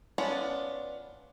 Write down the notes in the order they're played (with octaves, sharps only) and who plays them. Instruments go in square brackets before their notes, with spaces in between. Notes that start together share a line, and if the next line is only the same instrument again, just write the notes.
[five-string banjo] B3 C#4 D4 F4